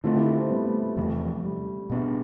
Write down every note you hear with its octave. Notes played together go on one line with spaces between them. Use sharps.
D3 A3 C4 F4 A4
E4 G4
F4 A4
A3 C4
G3 B3
A3
E2 C3 F3 A3
G3
B2 B3 D4